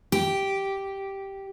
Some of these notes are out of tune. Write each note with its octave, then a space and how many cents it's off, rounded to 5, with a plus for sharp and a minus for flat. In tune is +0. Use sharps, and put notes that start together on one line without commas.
G4 -5